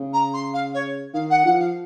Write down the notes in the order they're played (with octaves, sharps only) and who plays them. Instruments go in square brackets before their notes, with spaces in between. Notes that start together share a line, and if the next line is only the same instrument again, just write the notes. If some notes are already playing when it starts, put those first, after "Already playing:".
Already playing: [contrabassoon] C#3
[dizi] A#5
C6
F5
C#5
[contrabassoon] D#3 [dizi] F5
[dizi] F#5
[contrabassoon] F3 [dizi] F#5
[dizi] F5